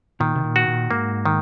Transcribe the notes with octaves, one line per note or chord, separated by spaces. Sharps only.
A#2 D#3
C3
A#2
F#4
A#2
G#2 A#3
D#3